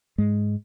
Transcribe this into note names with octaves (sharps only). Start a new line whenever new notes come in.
G#2 G#3